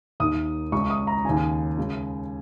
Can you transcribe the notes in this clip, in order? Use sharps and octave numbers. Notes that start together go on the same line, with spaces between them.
D#2 D#3 D#6
C#2 C#3 C#6
D#6
A#5
D#2 C#3 G#5
C#2 C#3